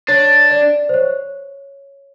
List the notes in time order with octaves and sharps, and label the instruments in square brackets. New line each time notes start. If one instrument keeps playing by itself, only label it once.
[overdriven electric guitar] D4 [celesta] C#5
[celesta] D5
C5
C#5